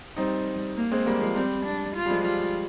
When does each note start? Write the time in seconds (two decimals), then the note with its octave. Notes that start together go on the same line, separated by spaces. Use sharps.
0.16 G3 C4 D#4
0.76 A#3
0.92 G#3 C4
1.06 G3 A#3
1.21 F3 G#3
1.35 G3 C4
1.65 D4
1.96 F4
2.06 G3
2.10 F3 G#3
2.25 G3 F4